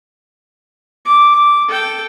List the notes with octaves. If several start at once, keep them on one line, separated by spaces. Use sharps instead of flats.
D6
A4 G5